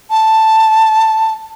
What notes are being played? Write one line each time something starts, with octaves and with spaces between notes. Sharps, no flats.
A5